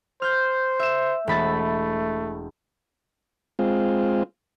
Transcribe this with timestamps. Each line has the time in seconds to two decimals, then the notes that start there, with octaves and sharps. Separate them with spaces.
0.22 C5 F6 G6
0.79 E5 E7
1.27 E1 A3 B5 A6
3.59 G#3 C4 F4